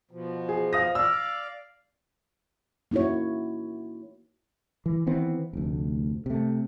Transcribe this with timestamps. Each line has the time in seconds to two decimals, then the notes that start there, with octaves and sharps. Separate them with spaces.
0.11 B2 F3
0.49 G#4
0.73 F5 D#6 A#6
0.95 D5 F5 E6
2.91 A#3 D#4 E4 F#4 C#5
4.86 E3
5.07 D#3 E3 B3 C4
5.53 F1 D2
6.26 C3 A3